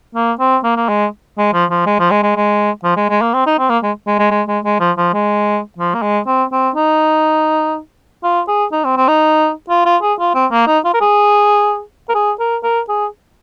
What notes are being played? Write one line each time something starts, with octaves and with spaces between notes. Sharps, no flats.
A#3
C4
A#3
A#3
G#3
G#3
F3
F3
G#3
F3
G#3
G#3
G#3
F3
G#3
G#3
A#3
C4
D#4
C4
A#3
G#3
G#3
G#3
G#3
G#3
G#3
F3
F3
G#3
F3
A#3
G#3
C4
C4
D#4
F4
G#4
D#4
C4
C4
D#4
F4
F4
G#4
F4
C4
A#3
D#4
F4
A#4
G#4
A#4
G#4
A#4
A#4
G#4